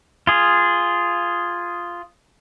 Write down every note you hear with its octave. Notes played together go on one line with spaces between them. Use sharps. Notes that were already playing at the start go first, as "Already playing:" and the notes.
F4 G#4